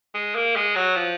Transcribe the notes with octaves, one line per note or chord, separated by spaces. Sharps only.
G#3
A#3
G#3
F#3
F3